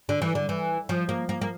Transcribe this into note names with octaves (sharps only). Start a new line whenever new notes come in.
D3
E3
D3
E3
F3
A#3
A#3
A#3